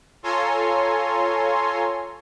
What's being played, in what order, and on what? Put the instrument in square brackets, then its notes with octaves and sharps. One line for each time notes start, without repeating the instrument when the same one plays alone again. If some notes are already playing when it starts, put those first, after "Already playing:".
[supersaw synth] F4 A4 C#5 G#5 A#5 C6